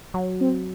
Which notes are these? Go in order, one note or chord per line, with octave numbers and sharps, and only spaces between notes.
F#3
C4